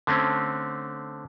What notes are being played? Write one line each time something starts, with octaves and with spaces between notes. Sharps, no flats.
D3 A3 C4 C#4